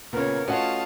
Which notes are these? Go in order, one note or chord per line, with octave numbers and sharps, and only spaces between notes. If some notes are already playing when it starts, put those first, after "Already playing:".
A#2 C#3 B3 C#4 A#4 C#5
A3 C#4 F4 F#4 C#5 D#5 F#5 A5